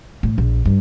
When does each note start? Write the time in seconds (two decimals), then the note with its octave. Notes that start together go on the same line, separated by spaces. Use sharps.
0.23 A2
0.38 A#1
0.65 G2